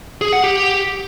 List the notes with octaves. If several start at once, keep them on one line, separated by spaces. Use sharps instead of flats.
G#4
F#5
G4